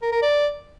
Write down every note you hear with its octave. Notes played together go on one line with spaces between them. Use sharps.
A#4
A#4
D5